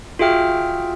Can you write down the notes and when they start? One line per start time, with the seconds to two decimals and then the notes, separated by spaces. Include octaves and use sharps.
0.19 F4 F#4 G#4 E5 G5 F6